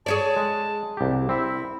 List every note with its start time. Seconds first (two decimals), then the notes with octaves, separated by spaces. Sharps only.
0.06 G#4 C#5 D5 A5
0.36 G#3
0.97 C2 G4
1.29 C4 E4 E5